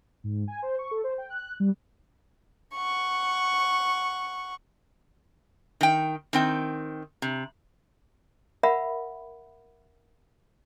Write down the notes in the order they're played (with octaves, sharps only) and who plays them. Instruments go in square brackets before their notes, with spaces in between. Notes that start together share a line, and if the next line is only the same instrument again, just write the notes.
[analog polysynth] G#2
G#5
C5
C#6
A4
C5
G5
F#6
G3
[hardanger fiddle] F#5 C#6
[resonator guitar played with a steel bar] D#3 G5
D#3 C4 G5
C3
[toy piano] A#4 E5 F#5 B5